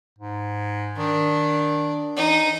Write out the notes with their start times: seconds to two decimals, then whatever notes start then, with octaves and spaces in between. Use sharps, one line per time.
0.19 G#2
0.97 D#3 D4
2.16 E3 D#4